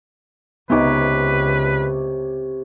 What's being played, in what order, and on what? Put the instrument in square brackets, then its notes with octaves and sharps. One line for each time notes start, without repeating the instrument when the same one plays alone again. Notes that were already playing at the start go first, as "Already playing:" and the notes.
[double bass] C#2 [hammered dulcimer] C3 C#5 D6 [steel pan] B3 D#4 [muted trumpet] B4